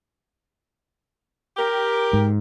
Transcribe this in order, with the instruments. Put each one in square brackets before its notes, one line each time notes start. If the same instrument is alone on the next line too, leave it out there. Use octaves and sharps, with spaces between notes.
[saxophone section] G4 A#4
[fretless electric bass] G#2